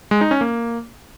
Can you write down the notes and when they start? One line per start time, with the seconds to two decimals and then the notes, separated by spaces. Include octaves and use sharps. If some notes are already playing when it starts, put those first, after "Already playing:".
0.11 G#3
0.21 D#4
0.31 C#4
0.41 A#3